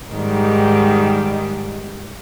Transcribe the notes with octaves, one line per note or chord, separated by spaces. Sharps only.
G#2 D#3 G3